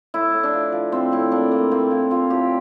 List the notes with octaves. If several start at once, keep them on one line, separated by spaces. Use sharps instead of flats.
A2 E4
A2
D4
F3
F3
A2 C4
A2 E4
A#3 D4
A2 A#3
A#3 C4
A#3 E4
F3 F4
A2 G4